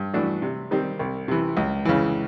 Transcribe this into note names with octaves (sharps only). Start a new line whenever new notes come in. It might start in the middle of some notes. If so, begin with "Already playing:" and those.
Already playing: G2
E3 A3 D4 F#4
C3
D#3 G3 C4
C2
C3 E3
C#2
C#3 E3